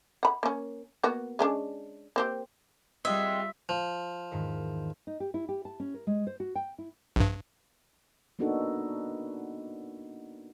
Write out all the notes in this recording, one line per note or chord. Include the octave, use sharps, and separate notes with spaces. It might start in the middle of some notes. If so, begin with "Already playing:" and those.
F#5 B5
A#3 C#4
A#3 B3 F#4
G#3 C#4 D4
A#3 C4 G4
G3 G#3 C4 F4 E5
F3
E2 G#2 D#3
D#4
G4
E4
G4
A5
C#4
A#4
G#3
C5
F#4
G5
E4
A#1 G2
A#3 B3 D4 D#4 F#4 A4